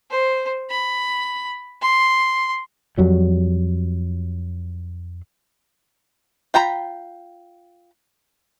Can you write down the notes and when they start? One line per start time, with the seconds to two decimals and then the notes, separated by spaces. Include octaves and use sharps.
0.10 C5
0.70 B5
1.81 C6
2.98 F2 F#3 G3
6.54 F4 G5 A#5 B5